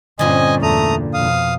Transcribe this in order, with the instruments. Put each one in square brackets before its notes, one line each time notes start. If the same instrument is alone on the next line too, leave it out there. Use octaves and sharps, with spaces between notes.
[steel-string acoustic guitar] G2 A#2 D3 [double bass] C4 C#4 [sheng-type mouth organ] D#5 G#5
[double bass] E2 [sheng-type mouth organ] A3 A#5 D#6
[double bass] F2 B2 [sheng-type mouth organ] F5 D#6